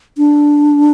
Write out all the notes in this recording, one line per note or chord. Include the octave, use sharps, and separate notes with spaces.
D4